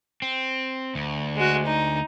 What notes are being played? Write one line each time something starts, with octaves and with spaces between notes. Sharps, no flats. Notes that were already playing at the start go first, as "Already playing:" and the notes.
C4
D2
G#3 F#4
D#4